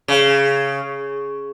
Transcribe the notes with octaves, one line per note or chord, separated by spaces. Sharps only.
C#3